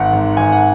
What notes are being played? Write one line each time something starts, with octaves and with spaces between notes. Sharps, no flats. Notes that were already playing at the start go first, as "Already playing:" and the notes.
Already playing: G#1 F#5
G#2
G#1 G#5
F#5